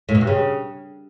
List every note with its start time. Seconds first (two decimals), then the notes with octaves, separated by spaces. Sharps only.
0.09 A2
0.15 B2
0.21 G2
0.27 C#3